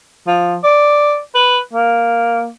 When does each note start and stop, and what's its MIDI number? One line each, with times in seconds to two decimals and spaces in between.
0.27 0.56 53
0.63 1.18 74
1.34 1.58 71
1.73 2.49 58